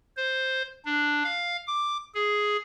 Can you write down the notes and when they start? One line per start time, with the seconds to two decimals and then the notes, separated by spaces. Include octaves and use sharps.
0.17 C5
0.85 D4
1.24 F5
1.67 D6
2.15 G#4